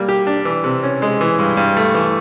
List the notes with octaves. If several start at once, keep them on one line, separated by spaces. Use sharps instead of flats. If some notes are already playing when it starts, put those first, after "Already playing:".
Already playing: G3 A#3
G4
D4
E3
C3
C#4
G#3
E3
G2
G2
A3
E3